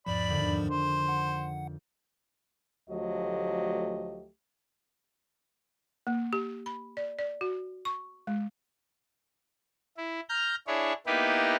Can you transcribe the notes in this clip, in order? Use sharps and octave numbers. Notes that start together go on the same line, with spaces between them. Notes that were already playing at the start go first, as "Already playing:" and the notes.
E2 G#2 F3 D5 B5
F2 D3 D#3
C5
F#5
D2 F3 F#3 A3 G4 D#5
A#3
G4
B5
D5
D5
F#4
C#6
G#3
E4
A#5 F6 G6
D4 E4 G#4 C#5
A#3 B3 D#4 E4 G4 B4